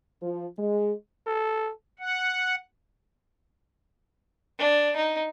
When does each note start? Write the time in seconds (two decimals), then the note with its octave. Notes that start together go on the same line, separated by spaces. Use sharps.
0.22 F3
0.59 G#3
1.27 A4
1.99 F#5
4.59 D4
4.96 D#4